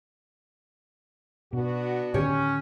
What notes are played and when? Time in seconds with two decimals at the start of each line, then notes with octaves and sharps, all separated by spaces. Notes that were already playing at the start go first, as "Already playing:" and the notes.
1.53 B2 B3 D4 F#4
2.14 A2 D3 D#3 C#4 G4 C#5